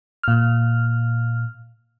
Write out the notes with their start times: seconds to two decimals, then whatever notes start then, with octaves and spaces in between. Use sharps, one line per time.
0.23 A#2 F6